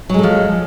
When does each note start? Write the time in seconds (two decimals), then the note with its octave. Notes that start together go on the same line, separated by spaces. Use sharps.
0.09 F#3
0.14 G#3
0.19 A4
0.23 F3